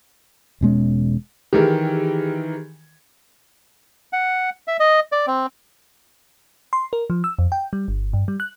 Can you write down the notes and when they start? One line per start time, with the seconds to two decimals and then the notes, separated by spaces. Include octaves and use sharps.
0.61 E1 B2 G#3 C#4
1.53 D#3 E3 G4 G#4 A#4
4.13 F#5
4.68 E5
4.80 D#5
5.12 D5
5.27 C4
6.73 C6
6.93 A#4
7.10 F3
7.24 E6
7.39 F2
7.52 G5
7.73 G3
7.88 G1
8.13 G2
8.28 G3
8.40 F#6